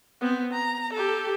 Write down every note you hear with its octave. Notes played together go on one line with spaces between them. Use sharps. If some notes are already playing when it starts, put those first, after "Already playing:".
B3 C4
A#5
G4 A4